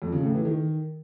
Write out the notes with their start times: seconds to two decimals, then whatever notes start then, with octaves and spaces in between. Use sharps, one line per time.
0.02 F2
0.12 C#3
0.23 A2
0.34 E3
0.45 D#3